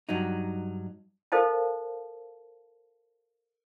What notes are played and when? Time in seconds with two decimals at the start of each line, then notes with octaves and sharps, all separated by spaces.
0.09 G2 F#3 D#4
1.32 A4 A#4 C5 D#5 F5 A5